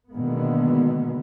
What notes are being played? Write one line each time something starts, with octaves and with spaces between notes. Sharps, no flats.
B2 D3 D#3 G#3 A#3 B3